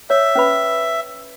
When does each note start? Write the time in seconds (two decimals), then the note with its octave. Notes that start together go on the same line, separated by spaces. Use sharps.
0.10 C#5 E5
0.35 C#4 B4 B5